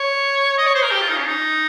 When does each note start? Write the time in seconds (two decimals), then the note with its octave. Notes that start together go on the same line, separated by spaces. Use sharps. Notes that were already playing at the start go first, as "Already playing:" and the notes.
Already playing: C#5
0.58 D#5
0.67 C#5
0.75 C5
0.84 A#4
0.91 G4
1.01 F4
1.09 D#4
1.17 C#4
1.26 D#4